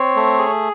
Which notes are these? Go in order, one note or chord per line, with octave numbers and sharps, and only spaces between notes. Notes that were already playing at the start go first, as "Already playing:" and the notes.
Already playing: C4 C#5
A3
G#4